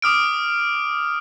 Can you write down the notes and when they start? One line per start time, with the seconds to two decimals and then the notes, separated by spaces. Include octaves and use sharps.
0.02 D6 D#6 F6 D7